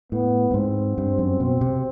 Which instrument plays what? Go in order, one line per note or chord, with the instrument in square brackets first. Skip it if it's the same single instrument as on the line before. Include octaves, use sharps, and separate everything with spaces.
[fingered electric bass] A2 [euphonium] B3
[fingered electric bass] G2
[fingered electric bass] G#2 [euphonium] C4
[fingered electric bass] G2
F#2
B2
C3